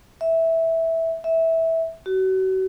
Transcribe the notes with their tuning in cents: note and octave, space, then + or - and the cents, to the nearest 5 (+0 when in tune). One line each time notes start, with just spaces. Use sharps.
E5 -10
E5 -15
F#4 +35